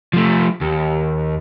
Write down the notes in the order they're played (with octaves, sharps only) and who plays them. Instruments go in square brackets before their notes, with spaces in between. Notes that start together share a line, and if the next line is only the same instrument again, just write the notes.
[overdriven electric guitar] F3 A3
D#2